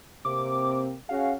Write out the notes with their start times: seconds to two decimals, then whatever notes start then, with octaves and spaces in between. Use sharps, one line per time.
0.25 C3 A#3 C4 D6
1.09 C#4 F#4 G#4 F5